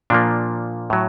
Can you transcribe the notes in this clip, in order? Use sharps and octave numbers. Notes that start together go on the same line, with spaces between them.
A#2 F3 A#3 D4
A2 F#3